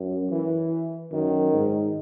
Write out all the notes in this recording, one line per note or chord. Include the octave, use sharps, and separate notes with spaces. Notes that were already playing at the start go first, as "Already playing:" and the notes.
Already playing: F#2
E3
F#2 D#3
G#2